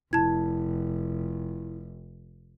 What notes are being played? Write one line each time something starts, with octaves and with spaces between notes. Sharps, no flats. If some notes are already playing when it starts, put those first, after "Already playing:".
F1 E4 A5 G#6